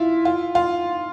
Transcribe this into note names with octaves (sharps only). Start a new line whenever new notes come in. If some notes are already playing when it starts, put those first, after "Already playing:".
Already playing: E4 F4
F4
F4